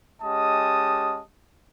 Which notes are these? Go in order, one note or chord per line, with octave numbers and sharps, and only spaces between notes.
G#3 C#4 G4 D#5 A5 D#6